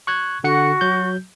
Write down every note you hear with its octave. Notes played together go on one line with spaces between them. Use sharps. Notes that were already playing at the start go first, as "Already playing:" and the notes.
C#6 F#6 G#6
D3 F#4 F#5 C#7
F#3 G6